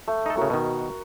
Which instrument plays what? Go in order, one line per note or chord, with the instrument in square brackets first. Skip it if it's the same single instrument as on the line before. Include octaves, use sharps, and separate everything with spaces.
[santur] A3
[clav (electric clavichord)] D#4 A4
[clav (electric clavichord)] A2 C#3 [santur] F#4 A#4
[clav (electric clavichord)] B2 D#3